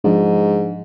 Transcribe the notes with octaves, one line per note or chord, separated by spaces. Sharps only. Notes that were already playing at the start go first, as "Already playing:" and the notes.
G#2 F3 D4